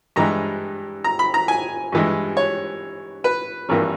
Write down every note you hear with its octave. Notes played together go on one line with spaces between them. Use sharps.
G2 E3 G#3 A#5
A#5
B5
A#5
G#5
G2 E3 G#3
C#5
B4
G#1 G2 E3 A#3